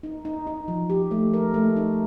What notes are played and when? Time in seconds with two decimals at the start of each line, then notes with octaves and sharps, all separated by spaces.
0.03 D#4
0.25 D#4
0.47 D#4
0.68 F3
0.90 G4
1.11 A3
1.34 A#4
1.54 A3
1.76 D#4